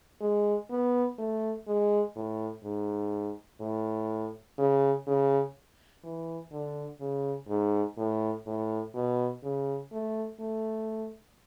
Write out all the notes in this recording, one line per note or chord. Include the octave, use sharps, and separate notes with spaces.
G#3
B3
A3
G#3
A2
G#2
A2
C#3
C#3
E3
D3
C#3
G#2
A2
A2
B2
C#3
A3
A3